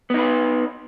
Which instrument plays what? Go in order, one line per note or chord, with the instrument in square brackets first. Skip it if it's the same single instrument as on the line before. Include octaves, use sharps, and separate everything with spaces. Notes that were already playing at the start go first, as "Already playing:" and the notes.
[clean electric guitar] B3
D#4
B4